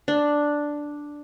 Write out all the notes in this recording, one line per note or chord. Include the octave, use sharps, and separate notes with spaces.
D4